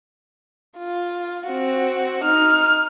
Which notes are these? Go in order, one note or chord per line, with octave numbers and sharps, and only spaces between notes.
F4
C4 F#4
D#4 F6